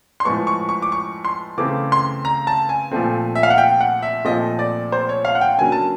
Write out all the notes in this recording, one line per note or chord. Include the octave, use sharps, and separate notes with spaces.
C6
A2 F3 G#3 B3 C#6
C#6
C#6
D6
C#6
C6
C#3 E3 A3 C4 D6
C6
A#5
A5
G#5
A#2 F3 A3 C4
E5
F5
F#5
G5
F#5
E5
A#2 F3 A3 C4 D#5
D5
C5
C#5
F5
F#5
G5
D3 F#3 A#3 C#4 G#5
A5